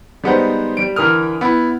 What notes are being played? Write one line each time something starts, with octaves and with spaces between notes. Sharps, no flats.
G3 G#3 B3 D#4 C5 F#5
G3 D7
D3 E3 A#4 D#6 F6
B3 E4